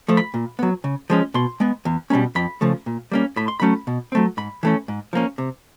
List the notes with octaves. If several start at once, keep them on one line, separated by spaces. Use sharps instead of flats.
F3 A3
B5
A#2
F#3 B3
C#3
F3 G#3 C#4
B2 C6
G#3 B3
E2
B2 G3 A#3 C#4
F2 B5
C#3 F3 A3
A#2
G3 A#3 C#4
A2 B5
C6
F#3 A3 C#4 B5
B2
F#3 A3 C4
G#2 B5
E3 A3 C#4
G#2
F3 A#3 C#4
C3